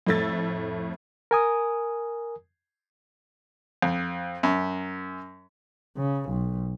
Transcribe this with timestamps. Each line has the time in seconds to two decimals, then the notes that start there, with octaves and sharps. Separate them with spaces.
0.07 F2 A2 A3 E6 A6
1.31 A#4 G#5 D#6
3.82 F2
4.43 F#2
5.97 C#3
6.29 B1